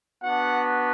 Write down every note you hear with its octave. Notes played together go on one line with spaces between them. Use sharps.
B3 D4 F#4 F#5